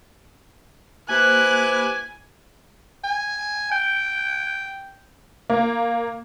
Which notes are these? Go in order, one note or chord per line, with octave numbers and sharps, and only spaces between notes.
A#3 E4 G4 B4 C5 G#5 D6 F#6
G#5
G5
A#3